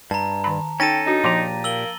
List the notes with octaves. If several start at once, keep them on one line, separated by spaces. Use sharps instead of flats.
G2 A5 A#5
D#3 B5
C#4 D#4 A4 G5 A6 A#6 D#7
D4 D#4 F#4
A#2 F3 G4 A#5 C6 D6
A#3 E6 F#7 G7